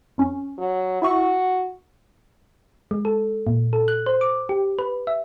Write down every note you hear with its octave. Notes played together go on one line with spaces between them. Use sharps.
F2 C#4
F#3
E4 F#4 E5 C#6
G#3
A4
A#2
A4
F#6
C5
D6
G4
B4
E5